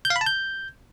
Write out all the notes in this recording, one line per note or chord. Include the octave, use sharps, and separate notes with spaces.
G6
F5
B5
A5
G6